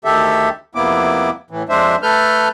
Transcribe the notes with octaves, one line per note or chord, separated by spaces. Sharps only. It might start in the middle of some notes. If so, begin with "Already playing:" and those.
D2 D#3 G4 A4 E5
F2 C3 A#3 B3 E4 D6
A2 E3
F2 G#3 D4 C5 E5
A3 A4 B4 F6 G6